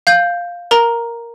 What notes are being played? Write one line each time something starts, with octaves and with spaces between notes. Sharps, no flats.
F5 G6
A#4 A#5